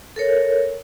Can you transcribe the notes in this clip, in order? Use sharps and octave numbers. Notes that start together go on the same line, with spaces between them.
A4 A#4 C#5